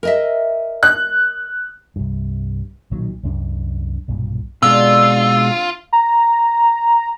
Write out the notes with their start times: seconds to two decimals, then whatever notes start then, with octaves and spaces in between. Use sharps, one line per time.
0.03 A#4 D#5 E5
0.83 F#6
1.96 C2 G2
2.91 B1 A#2 D#3 F#3
3.23 C2 F#2 C4 D4
4.08 B1 G2 A#2
4.63 B2 D3 G#3 C4 F4 E6
5.93 A#5